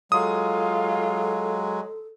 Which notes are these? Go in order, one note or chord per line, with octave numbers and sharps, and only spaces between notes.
F#3 G#3 F4 A4 D#6